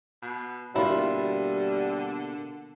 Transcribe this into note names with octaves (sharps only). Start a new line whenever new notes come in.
B2
B2 D3 G3 A#3 E4 F4